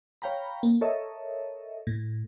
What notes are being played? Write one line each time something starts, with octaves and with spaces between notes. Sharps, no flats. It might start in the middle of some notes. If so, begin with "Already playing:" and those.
C#5 F5 G5 A#5 B5
A#3
A4 A#4 C#5 D#5 E5
A2